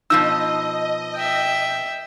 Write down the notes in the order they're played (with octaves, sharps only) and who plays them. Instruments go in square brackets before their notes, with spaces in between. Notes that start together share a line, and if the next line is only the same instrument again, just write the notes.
[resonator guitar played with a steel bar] B2 F3 D#4 [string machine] D#5 [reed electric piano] E6
[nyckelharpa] E5 G5